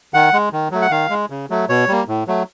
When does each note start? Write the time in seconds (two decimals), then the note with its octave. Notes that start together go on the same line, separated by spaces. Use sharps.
0.14 D#3 F#5
0.33 G#3
0.53 D#3
0.71 F#3 A3
0.82 F#5
0.91 D#3 F5
1.10 G#3
1.30 C#3
1.50 F#3 A3
1.69 B2 C#5
1.88 G3 A#3
2.08 A2
2.28 F#3 A3